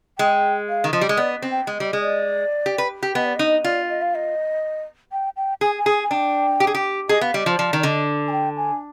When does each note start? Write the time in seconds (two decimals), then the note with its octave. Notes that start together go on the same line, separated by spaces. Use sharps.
0.18 G#3 G5
0.69 F5
0.84 D#3
0.92 F3 D#5
1.02 G3
1.09 G#3
1.17 B3 D5
1.42 C4
1.51 G5
1.67 G#3
1.80 G3 D#5
1.93 G#3
2.00 D5
2.66 G4
2.78 B4
3.03 G4
3.15 B3 D#5
3.25 D5
3.36 D#4 D#5
3.64 F4 D5
3.89 D#5
4.02 F5
4.15 D#5
5.12 G5
5.37 G5
5.61 G#4 G#5
5.79 G#5
5.86 G#4
6.03 G#5
6.11 D4 G5
6.60 G4
6.67 G#4
6.75 G4
7.09 G#4 D#5
7.21 B3 F5
7.34 G3 D#5
7.46 F3 C5
7.58 F3 D5
7.73 D#3
7.79 D5
7.83 D3 D#5
8.28 G#5
8.32 G5
8.57 G#5